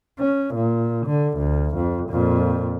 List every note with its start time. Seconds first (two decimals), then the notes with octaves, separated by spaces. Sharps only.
0.19 C#4
0.54 A#2
1.06 D3
1.38 D2
1.76 F2
2.10 F2 A#2